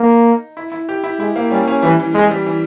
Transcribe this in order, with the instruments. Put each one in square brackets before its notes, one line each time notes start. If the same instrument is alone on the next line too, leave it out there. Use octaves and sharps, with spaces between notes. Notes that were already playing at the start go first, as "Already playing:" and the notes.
Already playing: [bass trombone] A#3 [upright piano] D#4
[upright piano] E4
E4
G4
E4
[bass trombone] G#3 [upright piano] E4
[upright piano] A#3
[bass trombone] G3 [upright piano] C#4
[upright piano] C#4
[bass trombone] E3 [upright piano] G3
[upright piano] E3
[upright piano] E3 [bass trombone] G#3
[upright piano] G3
E3